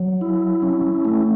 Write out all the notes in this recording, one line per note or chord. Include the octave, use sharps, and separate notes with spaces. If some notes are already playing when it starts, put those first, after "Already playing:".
Already playing: F#3
E4
C#4
A3